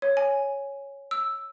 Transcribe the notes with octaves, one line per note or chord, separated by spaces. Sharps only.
C#5
G#5
E6